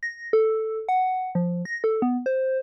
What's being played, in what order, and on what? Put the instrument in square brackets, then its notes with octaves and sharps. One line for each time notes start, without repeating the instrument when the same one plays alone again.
[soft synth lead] A#6
A4
F#5
F3
A#6
A4
B3
C5